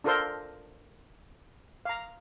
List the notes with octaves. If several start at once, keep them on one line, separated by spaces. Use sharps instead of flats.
D4 F4 A4 A#4 C5 C6
F5 A#5